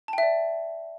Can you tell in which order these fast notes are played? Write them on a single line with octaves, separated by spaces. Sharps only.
A5 G5 E5 D5